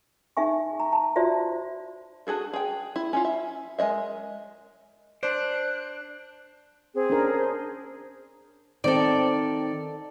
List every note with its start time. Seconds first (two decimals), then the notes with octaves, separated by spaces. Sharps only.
0.37 D#4 G#4 E5 G#5 C#6
0.80 A#5
0.93 A5
1.16 F4 F#4 C5 D5 E5
2.27 D4 F#4 G#4 A4
2.53 G#4 G5
2.96 E4
3.13 C#4 E4 F4
3.25 E5
3.79 G#3 A#4 D#5 E5
5.23 D4 C5 D5 F#6
6.95 C4 G#4
7.10 C#4 D4 A#4
7.37 C5
8.84 D#3 C4 A4 D5